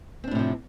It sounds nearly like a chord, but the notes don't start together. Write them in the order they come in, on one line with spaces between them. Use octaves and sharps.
C4 D4 A2 C3 F3